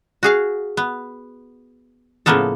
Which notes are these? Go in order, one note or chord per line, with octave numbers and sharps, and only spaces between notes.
F#4 G#4 F5
B3
A2 C#3 F3 A#3 B3 A4